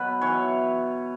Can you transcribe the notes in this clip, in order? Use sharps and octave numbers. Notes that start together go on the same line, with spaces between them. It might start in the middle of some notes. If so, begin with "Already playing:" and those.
Already playing: B2 F#3 B4
E3 C#5